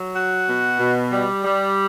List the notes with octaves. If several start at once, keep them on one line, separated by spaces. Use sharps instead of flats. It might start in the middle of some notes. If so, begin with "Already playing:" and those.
Already playing: F#3
F#4
B2
B2
G3
G3